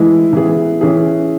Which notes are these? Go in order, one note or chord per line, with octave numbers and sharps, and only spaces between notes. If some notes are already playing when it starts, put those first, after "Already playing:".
Already playing: E3 G#3 E4
E3 B3 G#4
E3 C#4 G#4